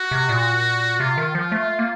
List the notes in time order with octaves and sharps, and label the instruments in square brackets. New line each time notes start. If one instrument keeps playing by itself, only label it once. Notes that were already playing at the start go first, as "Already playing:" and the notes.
Already playing: [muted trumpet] F#4
[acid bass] C3
A#2
[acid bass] C3 [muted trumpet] F4
[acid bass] D#3
F3
A3
A#3